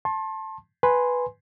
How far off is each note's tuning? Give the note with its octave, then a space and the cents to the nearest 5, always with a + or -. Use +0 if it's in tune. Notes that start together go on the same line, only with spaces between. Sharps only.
A5 +0 C6 +35
B4 +0 G#5 +0 C6 +0